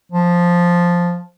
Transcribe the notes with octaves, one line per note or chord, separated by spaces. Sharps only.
F3